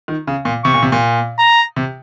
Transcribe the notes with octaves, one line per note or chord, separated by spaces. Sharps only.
D#3
C#3
A#2
C3 C#6
A#2
C3
A#2
A#5
C3